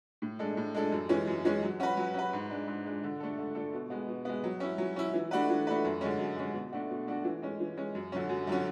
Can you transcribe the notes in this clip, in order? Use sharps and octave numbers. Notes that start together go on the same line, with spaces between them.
A2
G#3 D4 A4
A2
G#3 D4 A4
F#2
E3 G#3 C#4
F#2
E3 G#3 C#4
F#3
C#4 F#4 B4
F#3
C#4 F#4 B4
G#2
G#3 D4
G#2
G#3 D4
D3
A3 D4 A4
D3
A3 D4 A4
B2
G#3 B3
B2
G#3 B3
F#3
C#4 E4
F#3
C#4 E4
E3
A3 D4 F#4 B4
E3
A3 D4 F#4 B4
F#2
D3 G#3 C#4
F#2
D3 G#3 C#4
B2
A3 D4 F#4
B2
A3 D4 F#4
E3
G#3 C#4
E3
G#3 C#4
F#2
D3 F#3 C#4
F#2
D3 F#3 C#4